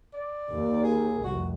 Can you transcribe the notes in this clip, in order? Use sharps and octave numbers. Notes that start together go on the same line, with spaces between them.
D5
D#2
G#4
F1 C2 F#4